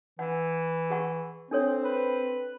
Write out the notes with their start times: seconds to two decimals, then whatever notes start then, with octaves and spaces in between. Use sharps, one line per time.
0.19 E3 F#5
0.90 G#4 F#5 C#6
1.51 C4 D4 A4 C#5
1.84 B4